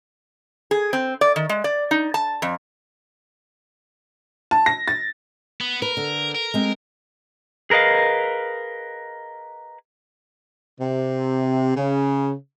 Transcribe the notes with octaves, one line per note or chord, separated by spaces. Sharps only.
G#4
C4
D5
D#3
G#3
D5
D#4
A5
F2
A5
A#6
A6
B3
A#4 B4
D3
A#4
G#3 C4
G#4 A#4 B4 D#5 F5
C3
C#3